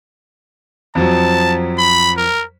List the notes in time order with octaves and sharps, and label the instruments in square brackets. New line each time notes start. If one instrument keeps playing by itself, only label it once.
[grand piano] F2 F3 F#3 [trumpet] A5
[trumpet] B5
A#4